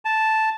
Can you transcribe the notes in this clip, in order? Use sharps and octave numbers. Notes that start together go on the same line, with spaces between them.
A5